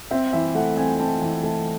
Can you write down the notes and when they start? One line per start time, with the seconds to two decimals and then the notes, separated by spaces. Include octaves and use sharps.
0.11 C4 E5
0.33 E3 E5
0.55 A3 F#5
0.77 C4 G#5
0.99 C4 A5
1.21 E3
1.43 A3 A5